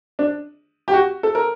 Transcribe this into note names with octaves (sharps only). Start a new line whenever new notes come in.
D4
G4
F#4
A4
A#4